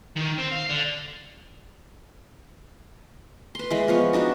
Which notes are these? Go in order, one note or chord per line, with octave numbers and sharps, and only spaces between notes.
D#3
C4
F5
D3
B4 C6
E3 G#3 B5
F3 B3 C#5
D4 D#4 F#4 E5